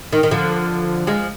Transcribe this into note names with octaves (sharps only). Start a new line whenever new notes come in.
D#3
D#3
D3 F3
F3 G#3